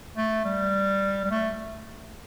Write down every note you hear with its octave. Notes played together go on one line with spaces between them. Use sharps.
A3
G3
G3
A3